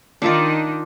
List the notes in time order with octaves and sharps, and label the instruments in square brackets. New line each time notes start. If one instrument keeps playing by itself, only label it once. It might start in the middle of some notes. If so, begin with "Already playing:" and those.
[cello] D#3 D#4 [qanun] D4 F4 D5